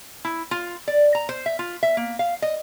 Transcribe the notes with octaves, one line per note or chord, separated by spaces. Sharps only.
E4
F4
D5
A#5
C5
E5
F4
E5
A#3
F5
D#5